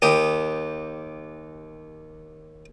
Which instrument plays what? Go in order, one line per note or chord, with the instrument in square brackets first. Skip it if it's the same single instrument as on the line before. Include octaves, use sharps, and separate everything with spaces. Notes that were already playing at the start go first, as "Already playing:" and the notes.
[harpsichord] D#2 G4 D#6